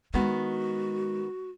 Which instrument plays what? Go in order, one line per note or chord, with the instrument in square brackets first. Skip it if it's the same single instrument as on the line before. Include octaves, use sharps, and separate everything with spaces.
[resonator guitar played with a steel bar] D#3 B3 [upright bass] G#3 [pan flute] F#4